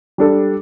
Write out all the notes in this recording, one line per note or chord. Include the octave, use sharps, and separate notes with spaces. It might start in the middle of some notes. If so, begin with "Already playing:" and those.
G3 D4 A4